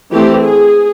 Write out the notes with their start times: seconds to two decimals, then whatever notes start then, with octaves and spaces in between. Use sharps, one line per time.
0.12 E3 A3 C4 G4
0.43 G#4